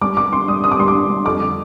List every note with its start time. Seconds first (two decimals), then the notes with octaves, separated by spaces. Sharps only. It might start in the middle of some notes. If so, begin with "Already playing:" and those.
0.01 G3 D6
0.17 G2 D6
0.32 G2 C6
0.48 G3 D#6
0.64 G2 D#6
0.71 D6
0.79 G3 C6
0.88 D6
0.94 G2
1.10 G3
1.25 F2 D6
1.41 D3